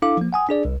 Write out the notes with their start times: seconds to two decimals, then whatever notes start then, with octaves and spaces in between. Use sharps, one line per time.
0.02 D4 E4 A4 F5 D6
0.17 F3 A#3
0.33 F#5 G#5 D#6
0.49 D4 G#4 D5
0.65 C2